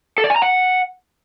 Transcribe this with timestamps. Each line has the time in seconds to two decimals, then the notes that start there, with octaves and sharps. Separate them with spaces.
0.18 A4
0.24 D5
0.30 G#5
0.36 A#5
0.42 F#5